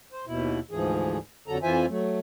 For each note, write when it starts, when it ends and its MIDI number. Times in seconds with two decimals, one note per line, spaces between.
0.12 0.25 72
0.27 0.59 39
0.27 0.59 47
0.27 0.59 64
0.71 1.18 38
0.71 1.18 44
0.71 1.18 52
0.71 1.18 53
0.71 1.18 68
1.48 1.58 41
1.48 1.58 50
1.48 1.58 54
1.48 1.58 69
1.48 1.58 82
1.63 1.86 41
1.63 1.86 52
1.63 1.86 65
1.63 1.86 72
1.63 1.86 76
1.63 1.86 80
1.89 2.19 54
1.89 2.19 57